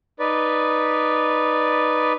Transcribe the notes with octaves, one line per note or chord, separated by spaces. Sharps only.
D#4 B4 D5